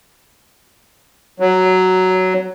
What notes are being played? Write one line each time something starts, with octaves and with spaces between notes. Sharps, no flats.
F#3